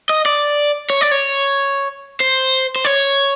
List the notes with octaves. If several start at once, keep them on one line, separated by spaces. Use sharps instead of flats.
D#5
D5
C#5
D5
C#5
C5
C5
C#5